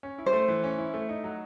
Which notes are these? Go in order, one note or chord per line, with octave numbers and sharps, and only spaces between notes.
C#4
E4
C5
A3
E3
C#4
E4
A3
D#4
F#3